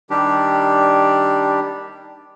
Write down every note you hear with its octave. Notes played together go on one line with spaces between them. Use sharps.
D#3 G3 D4 G4